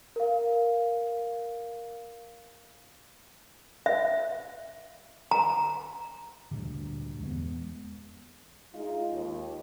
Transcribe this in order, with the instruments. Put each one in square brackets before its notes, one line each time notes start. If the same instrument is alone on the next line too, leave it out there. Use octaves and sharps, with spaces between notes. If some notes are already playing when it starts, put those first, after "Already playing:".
[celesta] A#4 F5
[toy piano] E5
A#5
[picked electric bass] D2 G2 A#2 D3
E2 G#3 A#3 B3
[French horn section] G#3 D#4 F4
D#2